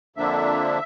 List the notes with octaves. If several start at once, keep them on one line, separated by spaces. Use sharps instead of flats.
F2 D3 F3 A#3 D4 E5